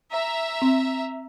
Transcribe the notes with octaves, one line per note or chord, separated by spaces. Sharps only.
E5 A#5
C4